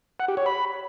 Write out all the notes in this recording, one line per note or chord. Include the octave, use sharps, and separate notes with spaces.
F#5
G4
C#5
B5